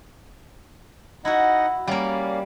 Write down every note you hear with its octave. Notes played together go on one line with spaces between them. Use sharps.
D#4 E4 F#4 D#5 F#5
G3 A#3 C#4 D5 F5